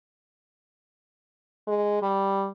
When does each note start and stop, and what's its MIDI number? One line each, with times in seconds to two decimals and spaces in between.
1.67 2.02 56
2.03 2.48 55